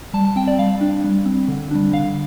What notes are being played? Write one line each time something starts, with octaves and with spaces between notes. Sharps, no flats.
G3 A5
A5
C4 G5
D5
G3 F5
D4
G3
C4
D3
G3 D4
D3 F5